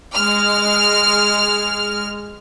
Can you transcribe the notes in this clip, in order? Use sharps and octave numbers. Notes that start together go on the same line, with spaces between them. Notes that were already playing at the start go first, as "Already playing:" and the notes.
G#3 F6